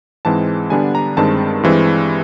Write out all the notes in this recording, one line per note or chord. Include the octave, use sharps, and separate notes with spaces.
G#2 E3 G#3 C4 A5
D3 G3 B3 D4 G#5
A#5
G2 D#3 G#3 C4 A5
G2 E3 G#3 C4